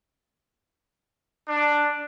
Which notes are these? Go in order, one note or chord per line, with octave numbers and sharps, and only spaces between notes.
D4